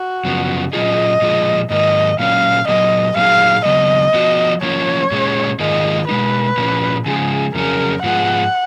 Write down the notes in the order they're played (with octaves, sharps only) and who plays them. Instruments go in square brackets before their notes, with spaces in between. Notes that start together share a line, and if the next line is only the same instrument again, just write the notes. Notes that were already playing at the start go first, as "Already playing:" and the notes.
Already playing: [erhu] F#4
[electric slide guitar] F#2 C#3 F3 B3
[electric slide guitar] A#2 F#3 C#4 F4 G#4 [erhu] D#5
[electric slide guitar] A#2 F3 G#3
[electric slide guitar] G#2 D#3 A#3 D#4 [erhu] D#5
[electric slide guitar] A#2 F#3 A#3 C#4 [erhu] F5
[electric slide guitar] A#2 F#3 A#3 [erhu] D#5
[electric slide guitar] A#2 F#3 A#3 D#4 G#4 [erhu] F5
[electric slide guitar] C#3 F#3 B3 [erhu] D#5
[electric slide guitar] F3 B3 F#4
[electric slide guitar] F3 A#3 C#4 F4 [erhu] C#5
[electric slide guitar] A#2 G#3 C#4
[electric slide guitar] G#2 D#3 A#3 F4 G#4 [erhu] D#5
[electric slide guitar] B2 G#3 D#4 [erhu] B4
[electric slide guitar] A#2 F3 A#3 C#4
[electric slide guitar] C#3 F3 G#3 [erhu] G#4
[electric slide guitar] F2 C#3 F#3 C#4 G#4 [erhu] A#4
[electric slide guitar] G#2 F3 B3 F4 G#4 [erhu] F#5